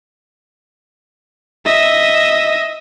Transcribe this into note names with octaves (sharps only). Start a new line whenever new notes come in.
D#5 E5